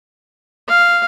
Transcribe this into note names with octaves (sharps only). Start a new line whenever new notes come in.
F5